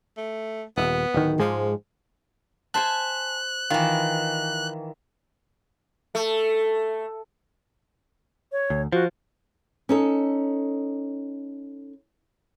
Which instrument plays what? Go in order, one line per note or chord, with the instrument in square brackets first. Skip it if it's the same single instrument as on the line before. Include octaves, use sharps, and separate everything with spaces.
[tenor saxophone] A3
[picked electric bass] D#1 [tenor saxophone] B3
[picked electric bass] D1 D#3
[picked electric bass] G#2 G#3 [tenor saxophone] F3
[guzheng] C5 E5 [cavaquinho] G#5 A5 [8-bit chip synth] F#6
[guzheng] D#3 E3 [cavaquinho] F4
[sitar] A3
[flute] C#5
[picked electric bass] D2
[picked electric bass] F3 [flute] F#4
[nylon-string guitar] C#4 D#4 A4